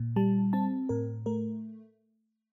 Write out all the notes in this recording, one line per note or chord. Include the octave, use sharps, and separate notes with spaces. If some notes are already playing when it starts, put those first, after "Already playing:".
Already playing: A#2
G3 A5
C4 A5
A2 A#4
A3 A#4